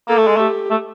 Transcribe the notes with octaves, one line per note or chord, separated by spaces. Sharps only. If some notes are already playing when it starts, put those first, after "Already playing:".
A#3 A4
A3
G#3
A3 G4
A3